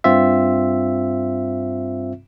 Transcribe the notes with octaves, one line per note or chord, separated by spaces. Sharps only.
G2 C4 F4 E5